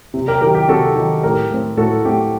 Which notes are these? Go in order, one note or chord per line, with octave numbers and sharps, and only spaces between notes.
C3
G4 A#4
D#3 G4 A#4
F#3
G4
C3 F#4 A4
D#3 F#3 G4
A2 G4 A#4
A3 C4
A2 F#4 A4
A3 C4 G4